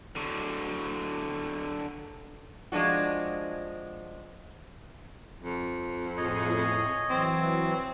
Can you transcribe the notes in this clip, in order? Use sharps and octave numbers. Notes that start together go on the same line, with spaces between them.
D3 F#3
F3 G#3 A3 D4 F#4
F2
A2 G#4 C#5 D#5
E3 F#3 C4